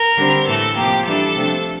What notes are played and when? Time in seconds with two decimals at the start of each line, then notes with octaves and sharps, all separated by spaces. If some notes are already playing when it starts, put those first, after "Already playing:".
Already playing: A#4
0.17 D3 G3 C4
0.46 A2 E3 A3 A4
0.76 C3 F3 A#3 G4
1.05 E3 G3 D4 A4
1.35 C3 F3 A3 D4